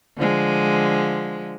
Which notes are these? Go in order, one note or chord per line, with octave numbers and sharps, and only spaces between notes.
D3 F3 G#3